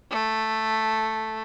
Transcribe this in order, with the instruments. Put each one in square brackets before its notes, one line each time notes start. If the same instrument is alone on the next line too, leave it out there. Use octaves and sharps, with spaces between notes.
[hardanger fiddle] A3